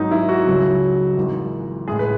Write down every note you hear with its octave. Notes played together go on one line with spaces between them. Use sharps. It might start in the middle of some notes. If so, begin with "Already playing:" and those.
Already playing: G#1 G#2 F#3 D#4
E4
F#4
C#2 C#3 F#3
G#1 G#2 E3
A1 A2 G#3 G#4
B4